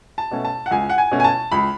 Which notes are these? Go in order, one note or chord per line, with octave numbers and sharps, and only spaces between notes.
A5
B2 A3 C#4
A5
F#5
C#2 G#5
F#5
G#5
B2 A3 C#4
G#5
A5
C#2 B5